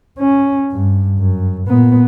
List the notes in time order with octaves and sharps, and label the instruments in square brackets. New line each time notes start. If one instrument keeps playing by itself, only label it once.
[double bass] C#4
G2
F#2
A#2 B3